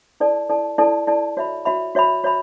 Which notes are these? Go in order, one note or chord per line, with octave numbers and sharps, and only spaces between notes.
E4 A4 D5 A5
E4 A4 D5 A5
E4 A4 D5 A5
E4 A4 D5 A5
F#4 C#5 E5 B5
F#4 C#5 E5 B5
F#4 C#5 E5 B5
F#4 C#5 E5 B5